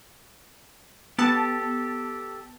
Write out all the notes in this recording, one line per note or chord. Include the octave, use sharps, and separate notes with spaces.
B3 G4 A4 A5